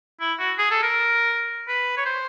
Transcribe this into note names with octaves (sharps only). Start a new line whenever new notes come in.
E4
F#4
G#4
A4
A#4
B4
C#5
C5